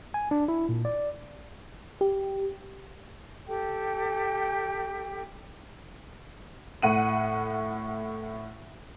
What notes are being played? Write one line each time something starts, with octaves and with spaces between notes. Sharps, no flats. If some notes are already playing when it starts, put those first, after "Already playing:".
G#5
D4
E4
A#2
D5
G4
G4 A4 G5
A2 F#5 D#7